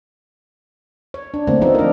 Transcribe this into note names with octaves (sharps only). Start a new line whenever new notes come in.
C#5
D4
D3 A3 A#3 C4
F3 B3 C4 D#4 A4
D4 A#4